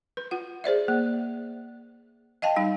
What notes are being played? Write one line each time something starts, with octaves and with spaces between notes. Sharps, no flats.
B4
F4 F#5
G#4 C5 D5 E5
A#3
D#5 F5 G5 A5
G3 D#4 F5